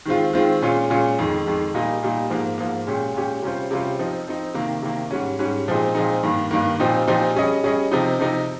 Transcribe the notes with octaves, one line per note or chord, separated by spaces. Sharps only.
D#3 G#3 C4 F4
D#3 G#3 C4 F4
A#2 G#3 C#4 F4
A#2 G#3 C#4 F4
F2 D#3 G#3
F2 D#3 G#3
A#2 G3 A#3 D#4
A#2 G3 A#3 D#4
G#2 F3 A#3
G#2 F3 A#3
A#2 G#3 C#4 G4
A#2 G#3 C#4 G4
C3 G3 C#4 F4 C5
C3 G3 C#4 F4 C5
F3 C4 D#4
F3 C4 D#4
C3 D#3 A#3
C3 D#3 A#3
G#2 G3 C#4
G#2 G3 C#4
A#2 F3 G#3 C4 D#4
A#2 F3 G#3 C4 D#4
G2 D#3 A#3
G2 D#3 A#3
A#2 F3 C4 D#4 G4
A#2 F3 C4 D#4 G4
G3 C#4 G#4 D#5
G3 C#4 G#4 D#5
C3 F3 C4 D#4
C3 F3 C4 D#4